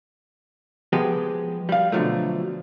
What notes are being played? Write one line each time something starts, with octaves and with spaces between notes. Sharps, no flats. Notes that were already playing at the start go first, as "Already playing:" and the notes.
F3 G#3 B3 G4 G#4 B4
G3 F5
B2 D3 D#3 F3 F#3 A3